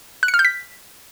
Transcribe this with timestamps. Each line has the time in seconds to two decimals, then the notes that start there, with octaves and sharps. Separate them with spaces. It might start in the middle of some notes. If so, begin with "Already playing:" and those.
0.23 F#6
0.28 C#7
0.34 F6
0.39 G6
0.45 B6